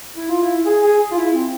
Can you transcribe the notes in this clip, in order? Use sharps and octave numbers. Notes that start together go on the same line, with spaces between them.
E4
F4
E4
G#4
G#4
F4
E4
C4